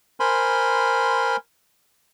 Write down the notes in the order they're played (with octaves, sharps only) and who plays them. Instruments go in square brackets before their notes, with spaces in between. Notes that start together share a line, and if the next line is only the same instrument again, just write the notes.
[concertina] A#4 C5 G#5 B5 C6